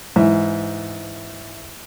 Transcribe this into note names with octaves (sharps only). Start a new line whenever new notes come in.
G#2 E3 E5